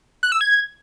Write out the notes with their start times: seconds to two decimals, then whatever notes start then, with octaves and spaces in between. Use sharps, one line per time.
0.23 F#6
0.32 E6
0.41 G#6